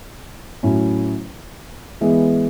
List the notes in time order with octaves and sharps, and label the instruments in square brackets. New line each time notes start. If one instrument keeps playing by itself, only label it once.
[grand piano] A2 F#3 C#4 E4
E3 G#3 B3